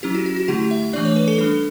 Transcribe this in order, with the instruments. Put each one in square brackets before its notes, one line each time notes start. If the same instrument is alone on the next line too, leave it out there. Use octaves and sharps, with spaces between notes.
[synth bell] F#3 C#4 E4 G4
F#4
F#4
F#4
D3 A3 E4 G4
E5
E3 A3 D4 D5
C#5
B4
A4
G3 D4 A4